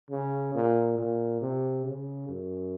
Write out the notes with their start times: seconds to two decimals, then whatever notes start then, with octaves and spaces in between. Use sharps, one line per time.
0.11 C#3
0.55 A#2
0.98 A#2
1.41 C3
1.85 C#3
2.28 F#2